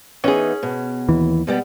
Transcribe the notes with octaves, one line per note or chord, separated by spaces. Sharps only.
E3 B3 C#4 D#4 G#4
B2
D#2 E3
B2 G3 B3